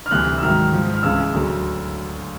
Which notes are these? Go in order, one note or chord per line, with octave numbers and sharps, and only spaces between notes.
F6
D2 C3 E3 F#6
E6
G#2 D#3 F#3 F6
G#2 F3
F6
C#2 C#3 E3 E6
D2 D3 F#3